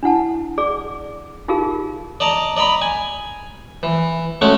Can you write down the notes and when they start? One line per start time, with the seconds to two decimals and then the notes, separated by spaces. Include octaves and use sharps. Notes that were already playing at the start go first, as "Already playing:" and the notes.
0.03 D4 E4 F#5 A5
0.58 G#4 D5 D6
1.48 D#4 F4 G4 G#4 A#4 F5
2.20 D5 D#5 A5 A#5
2.57 D5 D#5 A#5 B5
2.82 G#5
3.83 E3
4.41 G#3 A3 C#4 F#4